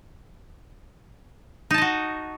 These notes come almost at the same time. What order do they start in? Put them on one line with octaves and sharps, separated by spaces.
D#4 A5 D#5 F#4